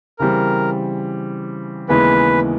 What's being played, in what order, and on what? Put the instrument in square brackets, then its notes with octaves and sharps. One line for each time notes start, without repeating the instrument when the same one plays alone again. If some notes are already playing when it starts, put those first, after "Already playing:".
[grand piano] C#3 E3 G3 C4 [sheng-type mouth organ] A#4
[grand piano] D#2 C#3 E3 G#3 B3 [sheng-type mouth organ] B4